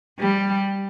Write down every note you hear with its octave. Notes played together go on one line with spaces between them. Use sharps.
G3